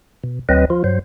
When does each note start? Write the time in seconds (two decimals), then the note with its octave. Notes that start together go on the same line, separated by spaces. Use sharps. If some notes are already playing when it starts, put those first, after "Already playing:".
0.24 B2
0.49 D2 F#3 C4 B4 D#5
0.70 F3 F4
0.84 G2 F#3 C5